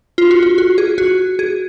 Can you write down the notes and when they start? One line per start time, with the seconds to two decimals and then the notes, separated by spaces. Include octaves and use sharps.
0.18 F4
0.31 F#4
0.43 F4
0.58 F#4
0.78 G#4
0.98 F#4
1.39 G#4